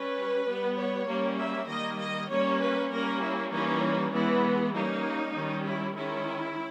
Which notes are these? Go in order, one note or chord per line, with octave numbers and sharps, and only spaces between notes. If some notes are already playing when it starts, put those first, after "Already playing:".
Already playing: G3 C#4 B4
G3 B3
C#5
G3 A#3 C#4
E5
D#3 G3 A#3 D#5
D#5
G3 A#3 C#4 C#5
B4
G3 A#3 C#4 A#4
E4
E3 G3 A#3 C#4 D#4
E3 G#3 B3 E4
G3 A#3 C#4 D#4
D#3 G3 C#4
E4
D#3 G#3 C#4 E4